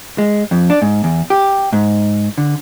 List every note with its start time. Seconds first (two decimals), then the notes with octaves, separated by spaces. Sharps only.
0.18 G#3
0.51 F2
0.70 D4
0.82 G#2
1.04 E2
1.30 G4
1.73 G#2
2.38 D3